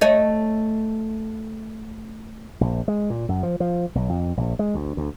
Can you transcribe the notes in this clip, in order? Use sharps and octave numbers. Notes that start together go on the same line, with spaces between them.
A3 C#5 D#5
A#1
G#3
A#2
F#2
F3
F3
B1
F2
A#1
G#3
D2
D2